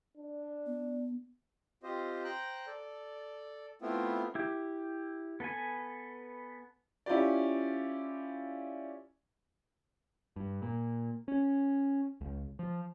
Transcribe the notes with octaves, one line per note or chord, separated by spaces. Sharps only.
D4
B3
C4 F4 G4 C5 D#5
C5 G5 A#5 F#6
A4 D5
A3 B3 C4 E4 F4
E4 G4
B3 A4 B4 G#5
C#4 E4 F4 G4 D5
G2
A#2
C#4
C#2
F3